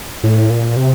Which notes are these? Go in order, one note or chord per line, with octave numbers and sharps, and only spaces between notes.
A2
A#2
C3